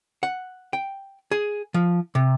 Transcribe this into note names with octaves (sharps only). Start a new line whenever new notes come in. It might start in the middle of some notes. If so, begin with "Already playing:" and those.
F#5
G5
G#4
F3
C3